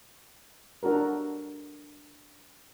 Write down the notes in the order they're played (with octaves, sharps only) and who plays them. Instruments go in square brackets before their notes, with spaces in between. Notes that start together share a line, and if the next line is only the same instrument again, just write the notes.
[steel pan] D4 F#4 A4 A#4